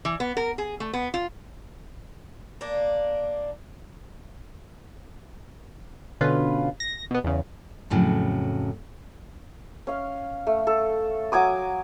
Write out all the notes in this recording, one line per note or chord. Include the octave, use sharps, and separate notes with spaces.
E3
B3
A#4
G#4
A3
B3
F4
A#3 D4
B2 D3 C#4 F4 B4
A#6
B2 B3
E2 C#3
F2 A2 C#3 F#3
C#4 F5
A3
A4
F#3 G#5 D6 D#6